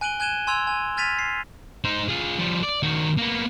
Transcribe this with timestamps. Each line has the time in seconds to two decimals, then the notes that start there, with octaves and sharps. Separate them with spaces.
0.01 G#5 F#6 D7 D#7 F#7 G7
0.20 G#5 F#6 G#6 D#7 E7 G7
0.47 G#5 C6 E6 G#6 F7
0.67 G#5
0.97 F6 G#6 A6 B6 D#7 F7
1.19 C7
1.84 D#4 C5
2.09 F4 G#4
2.39 F3 G3
2.63 D5
2.83 D#3 F#4
3.17 A#3 B3